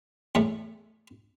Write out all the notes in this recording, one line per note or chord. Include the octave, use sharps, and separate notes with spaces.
E2 A2 A3